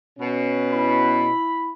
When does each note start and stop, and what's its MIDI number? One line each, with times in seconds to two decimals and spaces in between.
0.19 1.27 47
0.19 1.34 61
0.72 1.73 64
0.72 1.73 83